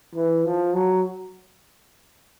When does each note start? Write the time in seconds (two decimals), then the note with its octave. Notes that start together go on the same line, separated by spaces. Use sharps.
0.14 E3
0.45 F3
0.75 F#3